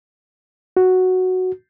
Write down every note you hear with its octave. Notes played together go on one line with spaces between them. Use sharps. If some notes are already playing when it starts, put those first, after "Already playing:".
F#4